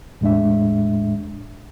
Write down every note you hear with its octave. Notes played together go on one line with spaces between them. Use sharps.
E2 A2 G#3 D4 E5